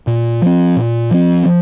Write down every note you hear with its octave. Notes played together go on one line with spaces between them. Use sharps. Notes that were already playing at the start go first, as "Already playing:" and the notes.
A#2
F3 C4
A#2
F3 C4
F3